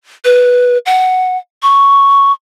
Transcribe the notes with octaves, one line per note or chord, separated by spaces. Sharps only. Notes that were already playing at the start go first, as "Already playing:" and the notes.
B4
F#5
C#6